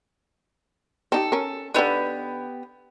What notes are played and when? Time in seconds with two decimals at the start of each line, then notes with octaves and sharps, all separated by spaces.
1.12 C4 D#4 G4 A4
1.32 C#4 A#4
1.74 D3 E3 B3 D#4 G4